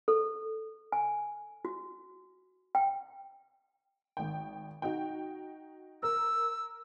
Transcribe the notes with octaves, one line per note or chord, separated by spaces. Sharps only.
A4
G#5
F#4
G5
G#1 G5
D#4 F#4 G5
A#4 E6